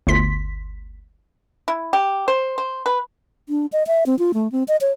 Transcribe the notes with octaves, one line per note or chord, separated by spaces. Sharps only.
G1 D2 C6 B6
E4
G4
C5
C5
B4
D4
D#5
E5
C4
F4
A3
C4
D#5
C#5